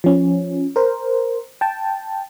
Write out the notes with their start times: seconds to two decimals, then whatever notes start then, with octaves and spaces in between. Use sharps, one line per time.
0.04 F3 C#4
0.76 A#4 C5
1.61 G5 A5